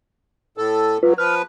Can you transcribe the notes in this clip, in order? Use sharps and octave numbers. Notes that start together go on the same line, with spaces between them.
A2 A4
F#3 F4 B4
F3 B4 F6